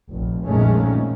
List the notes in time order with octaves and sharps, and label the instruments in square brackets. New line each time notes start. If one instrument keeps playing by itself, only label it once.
[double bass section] F1 A#1
F2 A#2 D#3 G#3 A3 C#4